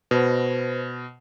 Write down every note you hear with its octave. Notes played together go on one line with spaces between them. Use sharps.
B2 B4 C5